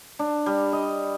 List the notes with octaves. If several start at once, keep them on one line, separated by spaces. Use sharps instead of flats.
D4
G3
D#5